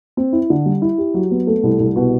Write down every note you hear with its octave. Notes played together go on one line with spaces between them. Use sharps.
C4
E4
D3
G3
E4
G4
F#3
B3
A3
C2
C2
B2